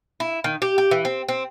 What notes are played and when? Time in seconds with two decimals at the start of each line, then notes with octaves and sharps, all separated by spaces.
0.20 E4
0.44 D#3
0.62 G4
0.78 G4
0.91 E3
1.05 C4
1.29 C4